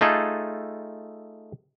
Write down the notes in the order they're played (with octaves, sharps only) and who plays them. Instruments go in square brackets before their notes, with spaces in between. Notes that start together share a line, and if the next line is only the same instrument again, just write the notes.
[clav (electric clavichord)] A3 D#4 F4 G#4 A4